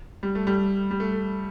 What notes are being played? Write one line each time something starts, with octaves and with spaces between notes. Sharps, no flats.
G3
A3
G3
G3
A3